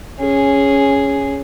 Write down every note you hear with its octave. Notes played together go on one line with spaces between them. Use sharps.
C#4 G#4